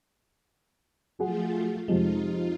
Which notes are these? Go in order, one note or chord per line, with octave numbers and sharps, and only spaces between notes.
F3 F#3 A3 F4 G#4 F#5
F2 C3 F3 G#3 D#4 F4